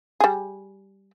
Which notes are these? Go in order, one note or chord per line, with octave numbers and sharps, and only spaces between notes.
G3 G#4